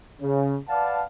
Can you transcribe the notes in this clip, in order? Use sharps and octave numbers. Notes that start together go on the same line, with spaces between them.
C#3
B4 D5 F5 F#5 A5